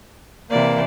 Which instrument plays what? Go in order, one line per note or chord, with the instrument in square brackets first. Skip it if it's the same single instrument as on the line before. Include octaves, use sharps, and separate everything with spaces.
[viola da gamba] C3 E3 D5 [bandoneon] A#3